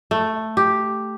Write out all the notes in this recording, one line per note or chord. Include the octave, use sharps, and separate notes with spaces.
A3
G4